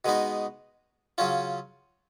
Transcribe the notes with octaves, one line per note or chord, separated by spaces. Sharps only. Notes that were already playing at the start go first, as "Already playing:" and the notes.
B2 G#3 B3 D#4
C#3 F#3 C#4 F4